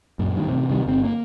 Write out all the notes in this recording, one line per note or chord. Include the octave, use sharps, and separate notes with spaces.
F#2 A#2
G2 D#3
A1 C3
C3 D#3 G3
G1 C4
A#3